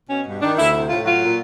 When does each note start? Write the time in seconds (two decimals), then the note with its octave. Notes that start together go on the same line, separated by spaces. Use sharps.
0.09 B2 C#4
0.26 G2
0.41 D#3 D4
0.57 D2 E4
0.73 C3 E4
0.89 A2 F4
1.05 F#3 F4
1.21 A#2